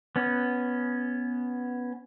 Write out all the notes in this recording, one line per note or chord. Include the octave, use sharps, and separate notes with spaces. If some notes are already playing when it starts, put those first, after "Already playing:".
B3 C#4